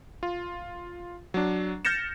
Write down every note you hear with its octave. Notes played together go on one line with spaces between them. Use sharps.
F4
F#3 D4
F6 G6 A6 A#6 C#7 E7